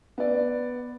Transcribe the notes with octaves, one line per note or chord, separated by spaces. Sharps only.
B3 D5